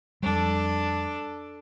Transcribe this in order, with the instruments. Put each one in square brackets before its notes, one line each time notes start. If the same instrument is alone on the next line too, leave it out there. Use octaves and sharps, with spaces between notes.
[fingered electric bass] F2 G3 [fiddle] D4 A4